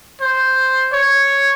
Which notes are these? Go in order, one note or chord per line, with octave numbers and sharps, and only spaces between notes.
C5
C#5